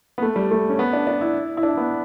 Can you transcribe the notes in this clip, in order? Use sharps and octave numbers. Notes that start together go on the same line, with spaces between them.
B3
A3
G3
A3
C#4
B3
D4
D4
E4
E4
D4
B3